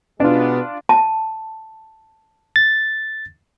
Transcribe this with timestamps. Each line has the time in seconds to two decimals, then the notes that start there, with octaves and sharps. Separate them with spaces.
0.20 B2 G#3 B3 D4 F4
0.89 A5
2.56 A6